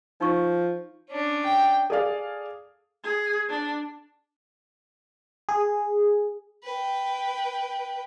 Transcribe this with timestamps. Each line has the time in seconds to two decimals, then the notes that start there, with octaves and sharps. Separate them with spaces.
0.21 F3 D#4 C#6
1.10 C#4 D4
1.44 G5
1.90 G#4 A4 D5 F5
3.04 G#4
3.49 D4
5.49 G#4
6.64 B4 G5